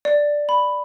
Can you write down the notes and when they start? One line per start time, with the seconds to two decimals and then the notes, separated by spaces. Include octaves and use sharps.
0.05 D5
0.49 B5